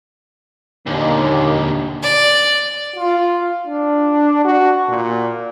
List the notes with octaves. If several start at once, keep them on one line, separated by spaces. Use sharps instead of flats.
D#2 A#2 D3
D5
F4
D4
F#4
A#2